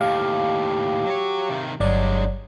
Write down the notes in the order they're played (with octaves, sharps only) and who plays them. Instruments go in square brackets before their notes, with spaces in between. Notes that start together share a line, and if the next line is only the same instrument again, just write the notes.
[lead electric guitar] D#2 A2 [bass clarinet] G4 [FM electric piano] F5
[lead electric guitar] F#3 C#5
C3 D#3
[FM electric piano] G1 D5 [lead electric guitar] G2 G#3 [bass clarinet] F#3